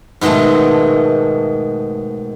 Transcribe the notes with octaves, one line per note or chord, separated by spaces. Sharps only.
G#2 B2 D#3 G#3 A3